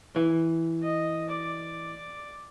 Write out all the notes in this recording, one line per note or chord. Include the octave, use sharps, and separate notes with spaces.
E3
D#5
D5